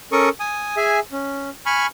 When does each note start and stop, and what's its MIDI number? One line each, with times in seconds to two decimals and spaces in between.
0.12 0.29 61
0.12 0.29 69
0.12 0.29 70
0.12 0.29 85
0.12 0.29 87
0.40 0.76 80
0.40 0.76 87
0.77 1.00 68
0.77 1.00 76
0.77 1.00 80
1.12 1.50 61
1.66 1.87 80
1.66 1.87 83
1.66 1.87 85
1.66 1.87 89